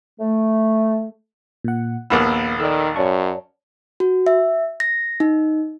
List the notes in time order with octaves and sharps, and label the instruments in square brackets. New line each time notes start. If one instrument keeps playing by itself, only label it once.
[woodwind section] A3
[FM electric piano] A#2 F#5
[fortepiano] A#1 D#2 B3 [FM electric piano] A#3 E6
[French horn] D#3 [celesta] A4 D5 [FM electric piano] E6
[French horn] F#2 [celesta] C#5 D5 A5 [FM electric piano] C#6
[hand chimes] F#4
E5
A#6
D#4